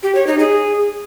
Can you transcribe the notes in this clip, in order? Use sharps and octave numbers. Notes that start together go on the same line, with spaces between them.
G4
C#5
D#4
G#4